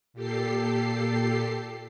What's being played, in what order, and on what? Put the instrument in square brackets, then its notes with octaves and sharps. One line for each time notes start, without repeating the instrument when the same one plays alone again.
[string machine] A#2 G4 A4 C7